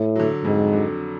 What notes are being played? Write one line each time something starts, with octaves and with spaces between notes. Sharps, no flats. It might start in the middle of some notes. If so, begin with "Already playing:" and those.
Already playing: A2
D3 F#3
F2 G#2
D3 F#3